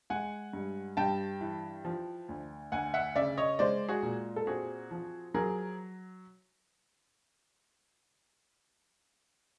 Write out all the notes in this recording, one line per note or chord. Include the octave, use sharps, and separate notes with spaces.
G#3 F#5 G#5
G2
G2 G5 A5
E3
F3
D2
D2 F#5 G#5
E5 F#5
C#3 D5 E5
C#5 D#5
G#3 C5 D5
F#4 G#4
A#2
A4
C4 F#4 G#4
F3
F#3 G#4 A#4